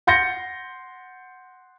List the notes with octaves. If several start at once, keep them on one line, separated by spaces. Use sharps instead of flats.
F#5 C6 G6 A6 A#6 C#7